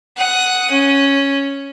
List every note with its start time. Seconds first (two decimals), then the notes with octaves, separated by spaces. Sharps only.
0.16 F#5 D#6
0.71 C#4